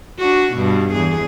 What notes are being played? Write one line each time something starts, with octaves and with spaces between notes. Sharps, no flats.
D4 F#4
G2 B2
E2 G#4